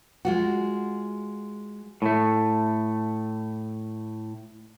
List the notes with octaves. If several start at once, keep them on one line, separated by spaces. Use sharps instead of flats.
G#3 F4 F#4
A2 A3